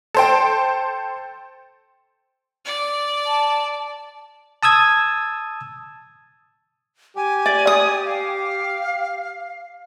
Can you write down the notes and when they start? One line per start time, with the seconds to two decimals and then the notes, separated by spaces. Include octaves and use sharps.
0.14 A4 C5 G5
2.65 D5
3.26 A5
4.63 A5 D#6 E6 G#6
7.16 G4 G#5
7.46 D5
7.67 D#6
8.05 F5